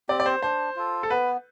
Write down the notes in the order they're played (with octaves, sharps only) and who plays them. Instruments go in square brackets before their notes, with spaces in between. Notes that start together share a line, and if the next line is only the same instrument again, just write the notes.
[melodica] C4 G4 [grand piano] D5
[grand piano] D5
C5
[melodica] D4 [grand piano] C5
[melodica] F4 A4
[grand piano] A4
[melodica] B3 [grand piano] B4